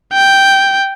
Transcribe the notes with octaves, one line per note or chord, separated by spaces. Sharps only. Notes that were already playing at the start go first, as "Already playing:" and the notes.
G5